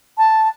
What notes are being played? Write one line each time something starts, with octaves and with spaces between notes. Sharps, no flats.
A5